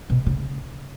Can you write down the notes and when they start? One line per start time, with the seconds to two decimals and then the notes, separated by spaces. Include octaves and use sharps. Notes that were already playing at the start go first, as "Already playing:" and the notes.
0.10 B2
0.26 C#3